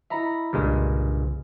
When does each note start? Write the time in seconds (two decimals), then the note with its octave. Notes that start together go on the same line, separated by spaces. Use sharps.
0.10 E4 D#5 E5 A#5 B5
0.53 C2 G2 A#2 C#3 G#3